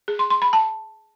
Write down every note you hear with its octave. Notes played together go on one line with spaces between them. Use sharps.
G#4
C6
C6
B5
A5